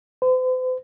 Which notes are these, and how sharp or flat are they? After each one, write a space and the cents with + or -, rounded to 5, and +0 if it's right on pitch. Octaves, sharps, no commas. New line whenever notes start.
C5 -45